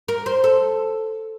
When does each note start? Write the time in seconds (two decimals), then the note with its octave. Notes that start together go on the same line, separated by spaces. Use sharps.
0.08 A#4
0.26 C5
0.44 A4